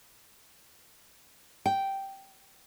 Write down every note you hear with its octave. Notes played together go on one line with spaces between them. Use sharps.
G5